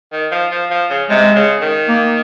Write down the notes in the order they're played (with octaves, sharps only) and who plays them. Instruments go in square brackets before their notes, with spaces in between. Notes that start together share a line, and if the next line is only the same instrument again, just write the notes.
[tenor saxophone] D#3
F3
F3
F3
C#3
[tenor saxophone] C3 [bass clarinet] G#3
[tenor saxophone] C#3
D#3
[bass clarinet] A#3